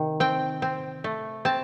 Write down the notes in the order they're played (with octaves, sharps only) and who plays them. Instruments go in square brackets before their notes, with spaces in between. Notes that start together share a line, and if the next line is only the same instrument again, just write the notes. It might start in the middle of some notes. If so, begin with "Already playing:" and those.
Already playing: [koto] C3 D#3
C4 G5
C4
A3
C4 A5